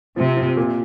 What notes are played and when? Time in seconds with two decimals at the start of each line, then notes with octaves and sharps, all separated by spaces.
0.16 C3 F3
0.37 F3
0.57 A#2